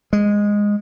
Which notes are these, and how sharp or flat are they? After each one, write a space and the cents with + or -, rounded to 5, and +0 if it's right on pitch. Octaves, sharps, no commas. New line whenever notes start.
G#3 -10